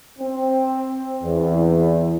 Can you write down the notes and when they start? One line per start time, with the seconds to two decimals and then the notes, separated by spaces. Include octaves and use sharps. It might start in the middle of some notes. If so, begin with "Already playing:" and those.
0.19 C4
1.23 E2